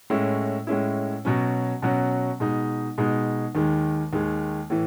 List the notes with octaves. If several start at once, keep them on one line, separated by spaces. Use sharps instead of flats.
A2 G#3 C#4 E4
A2 G#3 C#4 E4
B2 F#3 C#4
B2 F#3 C#4
B2 G#3 D#4
B2 G#3 D#4
D#2 D#3 G#3
D#2 D#3 G#3
A2 E3